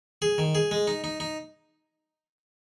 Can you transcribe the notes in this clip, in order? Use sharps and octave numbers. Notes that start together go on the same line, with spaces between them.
G#4
D#3
G#4
G#3
D#4
D#4
D#4